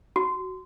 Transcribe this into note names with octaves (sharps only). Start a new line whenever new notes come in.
F#4